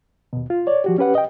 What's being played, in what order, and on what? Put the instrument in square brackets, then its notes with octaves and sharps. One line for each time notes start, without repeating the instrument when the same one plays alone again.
[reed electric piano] D#2 B2
F4
C#5 D5
F3 F#4 G4
C#4 G4 B4 F#5
D#5 G5